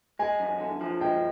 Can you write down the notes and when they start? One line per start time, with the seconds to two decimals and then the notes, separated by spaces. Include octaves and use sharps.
0.19 G#3 G#5
0.40 F#2
0.60 D3
0.81 F3
1.01 G#3 G5